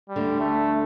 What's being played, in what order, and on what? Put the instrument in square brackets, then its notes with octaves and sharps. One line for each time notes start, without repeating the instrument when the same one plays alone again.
[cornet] G3
[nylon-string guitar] D2 D3
[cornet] A3